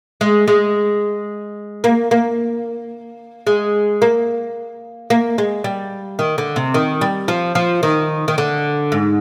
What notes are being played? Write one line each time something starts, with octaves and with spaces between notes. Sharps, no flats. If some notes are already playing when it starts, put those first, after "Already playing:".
G#3
G#3
A#3
A#3
G#3
A#3
A#3
G#3
G3
D#3
D3
C3
D#3
G3
F3
F3
D#3
D#3
D3
G#2